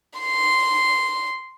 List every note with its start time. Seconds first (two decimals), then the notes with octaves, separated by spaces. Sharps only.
0.19 C6 C7